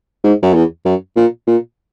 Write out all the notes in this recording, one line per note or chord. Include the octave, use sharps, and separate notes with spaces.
G#2
F#2
E2
F#2
A#2
A#2